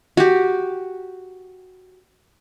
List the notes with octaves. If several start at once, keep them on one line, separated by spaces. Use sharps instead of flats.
F#4 G4